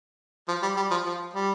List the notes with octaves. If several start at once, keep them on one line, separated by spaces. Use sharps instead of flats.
F3
G3
G3
F3
F3
G3